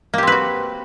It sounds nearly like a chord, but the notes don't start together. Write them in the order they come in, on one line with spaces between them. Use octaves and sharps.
A#3 G4 C4 B4 F#4